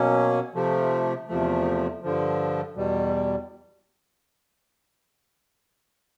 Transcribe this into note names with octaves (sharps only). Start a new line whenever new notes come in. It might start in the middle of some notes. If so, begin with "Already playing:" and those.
Already playing: B2 F#3 A#3 C#4
C3 F3 A3
E2 C3 F3 A3
G2 D3 F3
E2 B2 G3